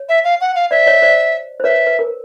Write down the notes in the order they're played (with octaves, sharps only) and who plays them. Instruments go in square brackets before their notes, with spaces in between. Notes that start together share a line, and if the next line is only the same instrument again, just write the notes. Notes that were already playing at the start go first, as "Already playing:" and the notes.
Already playing: [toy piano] C#5
[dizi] E5
F5
F#5
F5
[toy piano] C5 D5 [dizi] E5
[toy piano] C#5 D#5
C5 D5
C5
[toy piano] B4 C#5 [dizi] E5
[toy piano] B4
A#4